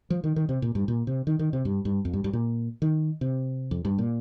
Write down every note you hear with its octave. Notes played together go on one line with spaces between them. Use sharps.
F3
D#3
D#3
C3
A#2
G2
A#2
C3
D#3
D#3
C3
G2
G2
F2
G2
G2
A#2
D#3
C3
F2
G2
A#2